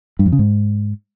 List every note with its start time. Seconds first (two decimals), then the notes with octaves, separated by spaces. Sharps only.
0.19 G2
0.26 F2
0.32 C#3
0.39 G#2